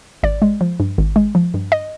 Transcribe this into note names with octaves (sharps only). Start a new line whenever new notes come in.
G#1 D5
G#3
F3
G2
G#1
G#3
F3
G2
D#5